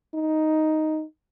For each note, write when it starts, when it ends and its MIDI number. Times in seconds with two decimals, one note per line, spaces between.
0.14 1.04 63